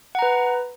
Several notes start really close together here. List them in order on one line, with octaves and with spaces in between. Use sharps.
F#5 A#5 B4